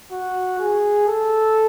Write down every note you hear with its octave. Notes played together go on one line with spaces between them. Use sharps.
F#4
G#4
A4